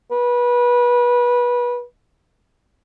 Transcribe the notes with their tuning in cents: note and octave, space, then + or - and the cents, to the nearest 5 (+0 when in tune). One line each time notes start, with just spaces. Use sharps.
B4 -25